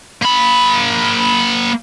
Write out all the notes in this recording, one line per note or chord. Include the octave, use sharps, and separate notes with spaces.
A#3 B5